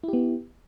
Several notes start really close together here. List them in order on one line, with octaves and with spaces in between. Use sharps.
E4 G4 B3